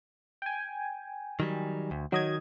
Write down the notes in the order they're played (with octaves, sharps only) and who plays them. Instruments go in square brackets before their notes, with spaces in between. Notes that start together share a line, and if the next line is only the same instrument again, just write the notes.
[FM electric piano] G5 G#5
[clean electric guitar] D#3 F#3 G3
D2
[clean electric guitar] D#3 [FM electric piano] F#3 D#5 G#6